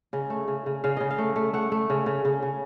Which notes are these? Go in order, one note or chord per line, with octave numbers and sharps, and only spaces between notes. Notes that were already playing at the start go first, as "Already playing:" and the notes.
C#3 D#5
A3
C#3
C#3
C#3 F5
C#3 D#5
F5
A3
A3
A3 F#5
A3
C#3
C#3
C#3
C#3